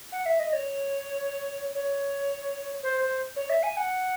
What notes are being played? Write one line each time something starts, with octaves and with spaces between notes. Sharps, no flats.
F#5
E5
D#5
C#5
C#5
C5
C5
C#5
E5
G#5
F#5